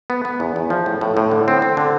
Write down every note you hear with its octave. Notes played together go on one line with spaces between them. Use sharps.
B3
B3
E2
E2
F3
A2
A2
A2
D3
C4
C4
D3